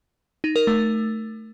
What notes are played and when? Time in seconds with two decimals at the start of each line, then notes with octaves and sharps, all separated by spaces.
0.44 D#4
0.56 A#4
0.67 A3